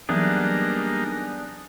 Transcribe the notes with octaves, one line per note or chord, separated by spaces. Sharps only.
E3 F#3 G3 A#3 B3 D4 D#4 G#4